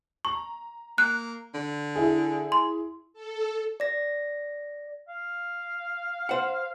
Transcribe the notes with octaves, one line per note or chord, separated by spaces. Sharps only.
A#5 C#6
A#3 F#6
D3
E4 G#4
C6
A4
D5 A#6
F5
C5 F#5